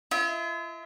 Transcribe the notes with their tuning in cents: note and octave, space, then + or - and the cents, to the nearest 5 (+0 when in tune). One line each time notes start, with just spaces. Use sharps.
F4 -45 E5 -35